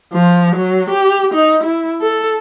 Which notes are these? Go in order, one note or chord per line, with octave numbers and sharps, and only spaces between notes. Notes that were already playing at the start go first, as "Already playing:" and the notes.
F3
F#3
G4
D#4
E4
A4